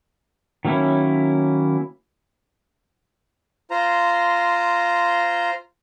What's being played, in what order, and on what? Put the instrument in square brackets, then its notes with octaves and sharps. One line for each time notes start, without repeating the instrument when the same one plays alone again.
[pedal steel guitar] D#3 F#3 A#3 C#4 E4
[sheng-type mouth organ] F4 C5 A#5